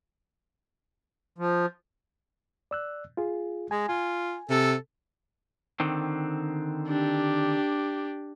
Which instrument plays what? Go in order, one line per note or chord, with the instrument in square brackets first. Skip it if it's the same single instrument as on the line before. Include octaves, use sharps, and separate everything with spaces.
[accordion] F3
[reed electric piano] D5 E6 F#6
F4 G#4
[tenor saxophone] G#3 [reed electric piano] G#5
[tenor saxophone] F4 [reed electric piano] G#5
[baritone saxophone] C3 [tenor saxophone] A4
[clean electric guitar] D3 D#3 C4
[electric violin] D4 G4